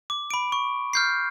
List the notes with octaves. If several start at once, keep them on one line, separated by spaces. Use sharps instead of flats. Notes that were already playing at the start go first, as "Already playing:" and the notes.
D6
B5 D7
C#6
F6 G6 C7